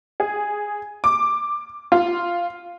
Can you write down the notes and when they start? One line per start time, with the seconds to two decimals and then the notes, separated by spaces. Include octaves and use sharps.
0.20 G#4
1.04 D6
1.92 F4